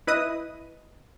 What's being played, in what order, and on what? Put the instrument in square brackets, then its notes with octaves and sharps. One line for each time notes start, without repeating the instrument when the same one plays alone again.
[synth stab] E4 B4 D#5 D#6